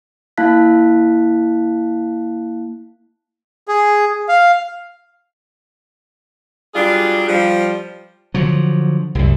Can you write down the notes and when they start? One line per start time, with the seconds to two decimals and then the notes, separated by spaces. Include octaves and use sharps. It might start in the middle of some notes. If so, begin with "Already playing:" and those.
0.38 A#3 E4 F5 A5 F#6 B6
3.68 G#4
4.29 F5
6.75 F#3 G3 D4 F4 G#4
7.27 F3 G3
8.34 D3 F3 F#3
9.15 C2 F#2